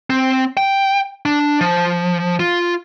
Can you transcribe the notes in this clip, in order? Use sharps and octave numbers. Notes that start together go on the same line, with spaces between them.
C4
G5
D4
F3
F4